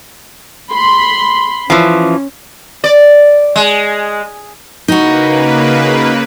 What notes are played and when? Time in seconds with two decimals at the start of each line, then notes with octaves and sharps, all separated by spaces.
0.72 B5 C6
1.70 E3 F3 C#4
2.84 D5
3.56 G#3
4.88 C#3 A#3 D#4 F#4 B4